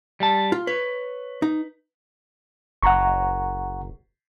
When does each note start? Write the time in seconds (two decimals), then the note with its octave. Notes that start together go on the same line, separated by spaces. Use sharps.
0.20 G3 A5
0.52 F4
0.67 B4 C#5
1.42 D#4
2.83 F#1 F#5 A#5 C#6